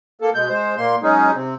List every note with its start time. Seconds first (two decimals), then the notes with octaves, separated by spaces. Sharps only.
0.21 A#3 A4
0.35 B2 G#3 G6
0.49 G#3 C5
0.77 A#2 A#3 C6
1.03 F#3 G#3 C#4 D#4 G#4
1.34 C3 C4